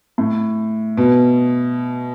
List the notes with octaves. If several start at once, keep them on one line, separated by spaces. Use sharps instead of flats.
A2
B2